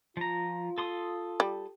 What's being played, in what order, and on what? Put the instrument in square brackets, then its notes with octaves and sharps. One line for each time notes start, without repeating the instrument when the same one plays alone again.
[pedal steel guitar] F3 A#5 [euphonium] F4
[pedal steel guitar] A4 C6 D#6
[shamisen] G3